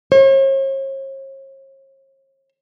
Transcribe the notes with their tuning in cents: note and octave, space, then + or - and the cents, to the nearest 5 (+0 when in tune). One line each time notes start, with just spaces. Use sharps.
C#5 -45